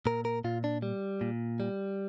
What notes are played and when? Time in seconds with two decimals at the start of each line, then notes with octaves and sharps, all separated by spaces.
0.06 A#2 A#4
0.25 A#4
0.44 A#2 F4
0.64 D4
0.82 G3
1.21 A#2
1.60 G3